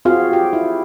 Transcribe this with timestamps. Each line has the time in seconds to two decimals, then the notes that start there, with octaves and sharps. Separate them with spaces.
0.05 C4 F4 F#4 G#4 F5
0.33 G4
0.53 E4